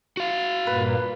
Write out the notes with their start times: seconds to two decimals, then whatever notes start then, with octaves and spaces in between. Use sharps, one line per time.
0.17 F#4 F5
0.67 G2 A#2 A#3 B4